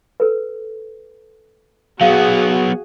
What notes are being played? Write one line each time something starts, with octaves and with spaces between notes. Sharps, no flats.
A4 B4
F#3 B3 F#4 G#4 F5